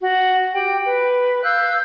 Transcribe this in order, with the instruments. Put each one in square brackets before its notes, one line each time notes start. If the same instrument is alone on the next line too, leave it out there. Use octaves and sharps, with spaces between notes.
[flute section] F#4
G4 G5
B4
F5 E6 F#6 G6